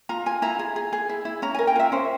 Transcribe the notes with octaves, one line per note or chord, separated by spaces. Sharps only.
F4 A#5
F4 G#5
E4 A#5
G#4
G#4
G#4
E4
E4
C#4 A#5
A#4 G#5
G5
F4 E5
C#4 C5